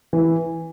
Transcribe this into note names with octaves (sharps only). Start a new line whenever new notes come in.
E3